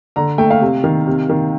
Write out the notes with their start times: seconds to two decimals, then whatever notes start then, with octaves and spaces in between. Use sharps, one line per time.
0.16 D3 A#5
0.38 A3 G5
0.50 F5
0.61 C3
0.84 D#3
1.07 C3
1.29 D#3